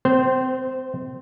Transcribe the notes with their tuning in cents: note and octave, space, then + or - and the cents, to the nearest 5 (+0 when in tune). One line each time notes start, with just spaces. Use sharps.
C4 -30 C5 +0